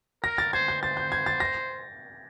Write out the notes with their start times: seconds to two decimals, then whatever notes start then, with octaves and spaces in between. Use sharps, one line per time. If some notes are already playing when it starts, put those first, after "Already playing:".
0.24 A#4 A#6
0.38 A6
0.53 C5 G#6
0.68 G6
0.82 C5 A6
0.97 G6
1.12 G#6
1.26 A6
1.40 A#6